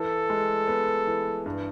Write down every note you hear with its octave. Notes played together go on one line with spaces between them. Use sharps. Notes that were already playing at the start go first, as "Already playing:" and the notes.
Already playing: E3 A4
G#3
B3
E3
G2